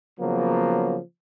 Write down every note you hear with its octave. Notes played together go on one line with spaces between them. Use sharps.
C#3 F3 F#3 A#3 B3